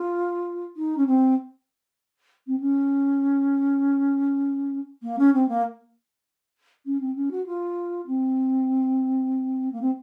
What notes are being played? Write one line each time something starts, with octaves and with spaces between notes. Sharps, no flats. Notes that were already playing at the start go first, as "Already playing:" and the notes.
Already playing: F4
D#4
C#4
C4
C4
C#4
A#3
C#4
C4
A#3
C#4
C4
C#4
F#4
F4
C4
A#3
C4